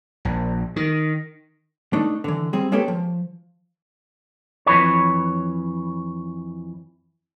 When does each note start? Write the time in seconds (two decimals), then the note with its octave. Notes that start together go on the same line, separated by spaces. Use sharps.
0.25 A#1
0.76 D#3
1.93 A3 D4 D#4
2.24 D3 E3
2.53 G3 C4 G#4
2.72 G#3 A#3 C#4 G4 A4 B4
2.88 F3
4.66 F2 E3 B4 C#5